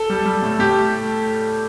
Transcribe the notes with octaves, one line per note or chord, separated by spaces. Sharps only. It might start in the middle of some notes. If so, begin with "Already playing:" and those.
Already playing: A4
G3
G3
A2
A2 G4